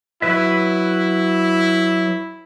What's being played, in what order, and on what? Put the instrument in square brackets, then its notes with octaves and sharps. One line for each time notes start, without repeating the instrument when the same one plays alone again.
[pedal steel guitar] F#3 B4 E5 [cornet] E4